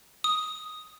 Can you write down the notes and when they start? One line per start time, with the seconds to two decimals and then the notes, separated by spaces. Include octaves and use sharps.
0.24 D#6